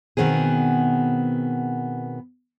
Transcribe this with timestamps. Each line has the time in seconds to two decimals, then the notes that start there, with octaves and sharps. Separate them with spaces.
0.17 B2 D#3 B3 C4 G#4